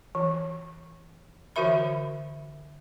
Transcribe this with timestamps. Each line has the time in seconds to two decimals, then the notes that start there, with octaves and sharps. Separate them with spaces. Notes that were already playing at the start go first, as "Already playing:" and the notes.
0.15 E3
1.56 D3 E3 F#4 A#4 E5 B5